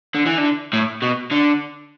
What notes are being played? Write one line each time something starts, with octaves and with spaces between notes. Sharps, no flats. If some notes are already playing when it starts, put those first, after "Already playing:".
D3
E3
D3
A2
B2
D3